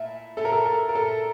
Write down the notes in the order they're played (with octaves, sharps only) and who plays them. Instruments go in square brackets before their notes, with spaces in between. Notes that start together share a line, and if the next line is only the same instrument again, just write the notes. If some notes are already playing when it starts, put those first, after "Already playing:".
Already playing: [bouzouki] A#2 A3 E4
[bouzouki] A#2 A3 E4 [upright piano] A4
[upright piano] A#4
A4
A#4
A#4
[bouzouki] A#2 A3 E4 [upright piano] A4